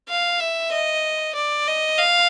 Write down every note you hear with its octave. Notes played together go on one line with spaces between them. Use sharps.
F5
E5
D#5
D5
D#5
F5